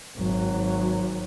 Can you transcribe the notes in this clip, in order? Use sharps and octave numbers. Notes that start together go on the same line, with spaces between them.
G#1 F#3